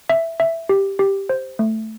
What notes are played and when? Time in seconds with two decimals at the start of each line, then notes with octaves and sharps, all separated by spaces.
0.10 E5
0.40 E5
0.69 G4
0.99 G4
1.29 C5
1.59 A3